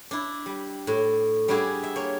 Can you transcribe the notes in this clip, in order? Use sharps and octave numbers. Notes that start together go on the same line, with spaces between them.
D4 E4
G3
A2
G3 D4 E4 F#4 G#4
E5
A#3 C#5